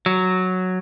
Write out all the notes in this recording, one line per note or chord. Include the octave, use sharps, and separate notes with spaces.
F#3